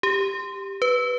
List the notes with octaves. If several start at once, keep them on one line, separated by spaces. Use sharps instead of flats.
G4
B4